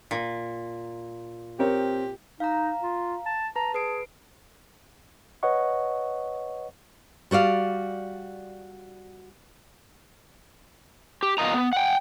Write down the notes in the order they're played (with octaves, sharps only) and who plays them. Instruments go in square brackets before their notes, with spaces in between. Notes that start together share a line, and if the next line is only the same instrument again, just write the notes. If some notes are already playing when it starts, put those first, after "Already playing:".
[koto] A#2
[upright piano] C4 A#4 C#5 [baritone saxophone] G4
[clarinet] D#4 [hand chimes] F5 A#5
[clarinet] F4
A5
[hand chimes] B4 A5 [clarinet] A#5
[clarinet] G#4 [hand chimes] B4 C7 D7
[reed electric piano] B4 C#5 D#5 F#5 C#6
[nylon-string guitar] G3 F#4 D5 F5
[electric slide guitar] G4
B2 F4 A#4 D#5 A#5
B3
F#5 G5